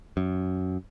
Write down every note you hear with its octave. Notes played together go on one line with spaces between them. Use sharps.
F#2